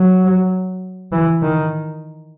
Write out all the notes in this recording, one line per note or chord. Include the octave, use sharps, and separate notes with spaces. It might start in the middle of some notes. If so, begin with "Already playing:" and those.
Already playing: F#3
E3
D#3